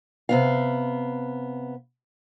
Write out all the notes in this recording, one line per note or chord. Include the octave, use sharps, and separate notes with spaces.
C3 B3 F5